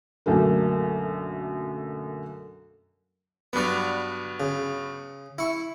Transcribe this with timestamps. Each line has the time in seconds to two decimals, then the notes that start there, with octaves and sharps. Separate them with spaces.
0.26 B1 F#2 D3 A3 A#3
3.53 G2 F#3 B3 B4 D5
4.40 C#3
5.38 E4 C#6